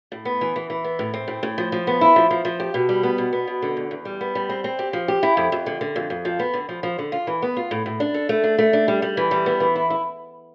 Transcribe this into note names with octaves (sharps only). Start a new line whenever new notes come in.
A2
B3
E3
E3
E3
B3
A2
C4
A2
A2
F3
F3
B3
E4
F3
F3
F3
G4
B2
G3
B3
B2
B3
B2
D3
E2
E2
G3
B3
G3
C4
C4
G4
F3
G4
E4
F2
F2
D3
D3
F2
F2
F3
B3
D3
F3
F3
D3
F4
E3
B3
F4
A2
A2
D4
A4
A3
D4
A3
D4
G3
G3
E3
G3
B3
E3
E4
E4